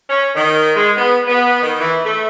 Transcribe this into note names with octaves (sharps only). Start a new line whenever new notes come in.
C#4
D#3
G#3
B3
B3
D#3
E3
A3